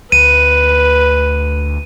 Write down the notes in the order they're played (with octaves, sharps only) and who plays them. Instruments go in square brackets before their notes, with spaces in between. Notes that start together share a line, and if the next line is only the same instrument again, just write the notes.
[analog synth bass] D2 [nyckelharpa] B4 [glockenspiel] D#7